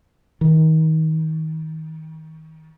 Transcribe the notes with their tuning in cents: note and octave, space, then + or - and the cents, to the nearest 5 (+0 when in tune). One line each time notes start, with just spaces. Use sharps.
D#3 +30